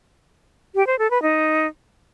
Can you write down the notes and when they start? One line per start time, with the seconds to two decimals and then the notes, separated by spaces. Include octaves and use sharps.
0.75 G4
0.87 C5
0.99 A4
1.11 B4
1.22 D#4